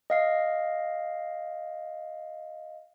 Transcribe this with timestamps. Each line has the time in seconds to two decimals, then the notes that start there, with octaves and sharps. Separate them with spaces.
0.10 D#5 F5 C7